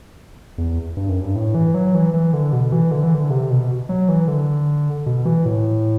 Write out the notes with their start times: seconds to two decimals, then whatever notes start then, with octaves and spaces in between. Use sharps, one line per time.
0.58 E2
0.97 G2
1.09 F#2
1.21 G2
1.36 A2
1.55 E3
1.74 F#3
1.94 E3
2.14 E3
2.33 D3
2.53 B2
2.72 E3
2.91 D3
3.03 E3
3.14 D3
3.30 C3
3.50 B2
3.89 F#3
4.09 E3
4.28 D3
5.06 B2
5.25 E3
5.45 A2